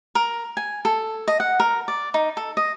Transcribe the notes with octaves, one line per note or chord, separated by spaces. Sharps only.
A#4
G#5
A4
D#5
F#5
A#4
D5
D#4
A4
D#5